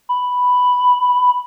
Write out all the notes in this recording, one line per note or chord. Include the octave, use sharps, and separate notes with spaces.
B5